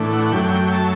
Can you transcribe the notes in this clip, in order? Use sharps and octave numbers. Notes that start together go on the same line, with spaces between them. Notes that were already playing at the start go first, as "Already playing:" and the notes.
Already playing: A2 E3 A3 D4
F#5
F#5
F#2 F#3 A3 G5
G5
A5